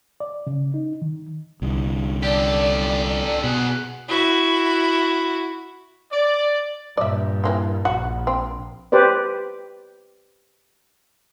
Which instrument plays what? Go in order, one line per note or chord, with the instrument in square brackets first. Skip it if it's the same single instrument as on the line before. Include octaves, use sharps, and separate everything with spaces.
[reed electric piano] D5
C#3
D#4
D#3
[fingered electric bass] C2 D3
[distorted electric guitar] G4 A4 [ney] D5
[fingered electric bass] B2 [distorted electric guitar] G#4 F#5
[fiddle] E4 F#4
[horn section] D5
[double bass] G2 A#2 [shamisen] D5 E5
[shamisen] E3 A#3 C4
[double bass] A#1 [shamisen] F#4
[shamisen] C4
[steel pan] G4 B4 C5 D5